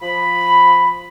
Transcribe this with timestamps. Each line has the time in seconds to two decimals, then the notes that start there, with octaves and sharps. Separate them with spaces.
0.02 F3 B5